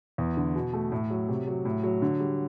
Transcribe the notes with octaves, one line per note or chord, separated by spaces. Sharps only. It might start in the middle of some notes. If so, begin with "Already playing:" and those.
E2
D3
B2
A3
A2
F#3
C3
F#3
A2
F#3
D3
G3